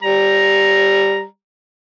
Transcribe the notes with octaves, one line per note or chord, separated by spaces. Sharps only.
G3 A#5